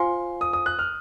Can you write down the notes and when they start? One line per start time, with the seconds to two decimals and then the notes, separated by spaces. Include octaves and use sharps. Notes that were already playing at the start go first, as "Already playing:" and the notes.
Already playing: F4 C5 F5 G#5 C6
0.41 D#6
0.53 D#6
0.66 F#6
0.79 F6